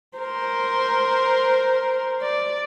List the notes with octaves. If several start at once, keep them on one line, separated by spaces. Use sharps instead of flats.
A#4 C5
D5